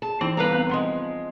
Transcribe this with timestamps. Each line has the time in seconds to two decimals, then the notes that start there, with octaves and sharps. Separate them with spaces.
0.02 G#4 A5
0.21 E3 C4 D#4 E4
0.37 G3 B3 B4 F5 A#5 B5
0.53 B3 C4
0.69 F3 G#3 F#5 C6